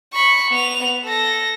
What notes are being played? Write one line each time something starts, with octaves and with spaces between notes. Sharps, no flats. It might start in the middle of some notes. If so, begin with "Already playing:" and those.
B5 C#6
B3 F7
A4 A#6